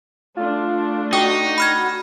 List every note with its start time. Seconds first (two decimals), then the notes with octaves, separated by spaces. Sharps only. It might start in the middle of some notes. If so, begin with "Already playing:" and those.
0.37 A3 D4 F4
1.13 D#4 F#4 G5 D#6
1.58 B5 F6 G#6